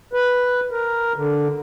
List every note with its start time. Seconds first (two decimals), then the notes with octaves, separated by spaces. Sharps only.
0.13 B4
0.71 A#4
1.16 D3